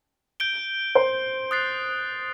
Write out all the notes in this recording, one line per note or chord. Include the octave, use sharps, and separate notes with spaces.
G6 D7 G7
C5
D#6 F#6 A6 C7